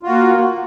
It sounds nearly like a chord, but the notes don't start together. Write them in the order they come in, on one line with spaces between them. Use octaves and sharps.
F4 F#4 A#3